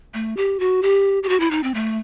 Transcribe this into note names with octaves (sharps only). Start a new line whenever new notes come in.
A3
G4
F#4
G4
G4
F#4
E4
D#4
C4
A3